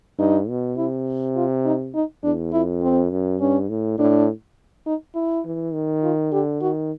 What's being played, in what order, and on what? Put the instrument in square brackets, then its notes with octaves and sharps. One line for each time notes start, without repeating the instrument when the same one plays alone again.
[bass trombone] G2 [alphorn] D#4
[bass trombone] B2
[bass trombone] C3 [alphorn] E4
[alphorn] F4
D#4
D#4
[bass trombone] E2 [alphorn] D4
[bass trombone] F2 [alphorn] E4
[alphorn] C4
[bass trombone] F#2
[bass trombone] G2 [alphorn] C#4
[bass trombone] A2
[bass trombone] A2 [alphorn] D4
[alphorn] D#4
E4
[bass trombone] E3
D#3
[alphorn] F4
[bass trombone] D3 [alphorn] G4
[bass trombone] D#3 [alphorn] F#4